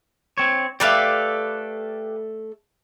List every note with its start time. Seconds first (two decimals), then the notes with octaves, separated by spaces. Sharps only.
0.38 C4 C#5
0.80 A3 G4 A4 B4 D5 F5